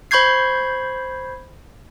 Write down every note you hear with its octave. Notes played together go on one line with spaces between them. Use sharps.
C5 B5 C#6 G6 G#6 C7